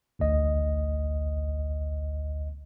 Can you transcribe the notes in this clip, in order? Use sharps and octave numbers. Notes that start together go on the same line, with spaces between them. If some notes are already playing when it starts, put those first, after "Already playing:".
A1 D2 D#5